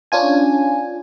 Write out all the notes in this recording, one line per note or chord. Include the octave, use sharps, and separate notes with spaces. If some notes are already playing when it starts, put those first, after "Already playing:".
C#4 D4 F4 G#5